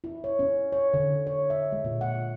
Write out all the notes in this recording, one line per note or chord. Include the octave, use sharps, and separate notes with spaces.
E4
C#5
C#4
C#5
D3
C#5
E5
G#3
A#2
F#5